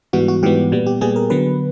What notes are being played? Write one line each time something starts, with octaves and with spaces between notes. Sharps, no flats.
G#2 E3 G3 B3 F#4
F#4
G#2 E3 G3 B3 G4
A#2 G3 B3
G4
A#2 G3 B3 G#4
A#4
D3 F#3 B3 B4